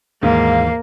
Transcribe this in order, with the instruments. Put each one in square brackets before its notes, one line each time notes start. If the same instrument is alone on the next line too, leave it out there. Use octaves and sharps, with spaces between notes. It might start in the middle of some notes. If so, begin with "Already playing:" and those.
[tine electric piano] D#2 E3 [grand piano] G#2 [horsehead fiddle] A#3 [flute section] F5